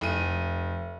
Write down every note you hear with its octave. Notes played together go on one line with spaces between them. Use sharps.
F1 D#7